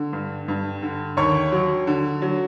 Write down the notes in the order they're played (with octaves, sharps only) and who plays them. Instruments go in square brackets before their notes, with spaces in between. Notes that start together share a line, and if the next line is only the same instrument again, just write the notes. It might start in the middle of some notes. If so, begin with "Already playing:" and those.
Already playing: [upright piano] D3
G2
G2
D3
D#2 C#5 C#6
F#3
D3
F#3